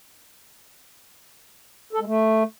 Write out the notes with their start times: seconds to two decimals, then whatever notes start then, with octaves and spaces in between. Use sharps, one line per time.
1.93 A4
1.99 G#3
2.06 A3